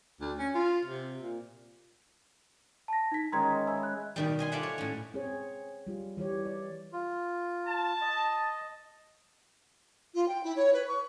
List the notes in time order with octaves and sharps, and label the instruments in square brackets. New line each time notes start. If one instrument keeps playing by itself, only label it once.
[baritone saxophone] D2
C#4
F4
C3
A#2
[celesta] A5 A#6
D#4 B6
[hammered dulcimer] D#3 G#3 C#4 [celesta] A#5 C6 G#6
[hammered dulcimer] E5 G#5 B5
[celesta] F#6
[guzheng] B2 D#3 G3
D#5 G#5 C6
F4 A4 D5 E5 F#5
C#5
A2 C#4
[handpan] C4 G#4 C#5
G3 F4
E3 G3 G4 C#5
D5
[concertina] F4
[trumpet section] A5
[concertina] D#5
[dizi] F4
G5
E4
C#5
B4
C#6